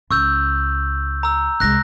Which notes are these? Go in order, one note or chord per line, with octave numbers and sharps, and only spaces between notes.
C#2 C#6 E6 G6
A#5 E6
C2 G#3 F#6 A#6